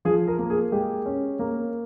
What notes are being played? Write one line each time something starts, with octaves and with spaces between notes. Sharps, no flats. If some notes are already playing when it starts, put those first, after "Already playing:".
F3 G#4
A#4
A#3
G#4
G#3 G4
C#4
A#3